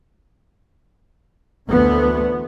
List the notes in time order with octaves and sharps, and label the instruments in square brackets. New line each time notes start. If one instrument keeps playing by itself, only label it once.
[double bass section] D2 D3 E3 A3 B3